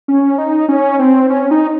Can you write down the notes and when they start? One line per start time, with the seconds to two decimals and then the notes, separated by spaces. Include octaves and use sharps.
0.08 C#4
0.38 D#4
0.69 C#4
0.99 C4
1.30 C#4
1.51 D#4